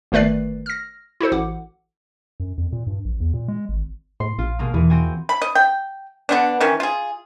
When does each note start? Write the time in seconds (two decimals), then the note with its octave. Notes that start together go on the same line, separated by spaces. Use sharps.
0.12 G1 D#3 A3 B4 D5 C7
0.66 F6 A#6
1.21 E4 F#4 A4 C5
1.32 A1 F#5 D6
2.40 F#2
2.58 F2
2.72 A#2
2.87 G2
3.05 A#1
3.20 E2
3.34 A#2
3.48 G#3
3.69 G#1
4.20 A2 C6
4.39 A#1 F4
4.59 B2 G#3 A#3
4.74 E2 E3
4.90 C4 F#4 G#5
5.29 B5
5.42 D#5
5.55 G5
6.29 D3 B3 D4
6.61 D#3 E3 C#4
6.80 F4 G#4